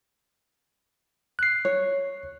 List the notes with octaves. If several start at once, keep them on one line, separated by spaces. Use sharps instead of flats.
F#6 C7
C#5